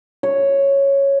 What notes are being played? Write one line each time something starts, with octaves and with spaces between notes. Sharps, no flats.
C#5